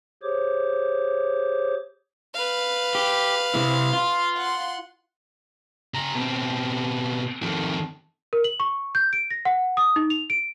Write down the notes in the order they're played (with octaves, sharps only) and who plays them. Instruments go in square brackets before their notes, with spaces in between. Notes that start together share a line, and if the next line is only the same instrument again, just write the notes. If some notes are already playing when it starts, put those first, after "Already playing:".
[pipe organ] G4 G#4 C5 C#5 D6
[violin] B4 F5
[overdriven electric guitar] G4
C3 E4
F4
[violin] F#5 C6
[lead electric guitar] C#3 A#5
B2 C4
F2 D#3
[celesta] A#4
F#7
C#6
G6
D7
A#6
F#5
D#6
D#4
F7
D7